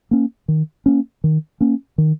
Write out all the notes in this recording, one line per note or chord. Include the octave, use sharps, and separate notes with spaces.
A#3 C#4
D#3
A#3 C#4
D#3
A#3 C#4
D#3